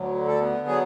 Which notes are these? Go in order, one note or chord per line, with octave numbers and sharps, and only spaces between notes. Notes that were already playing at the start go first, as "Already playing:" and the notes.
Already playing: D2 F#3
D3
A4
B3
F#3 G#4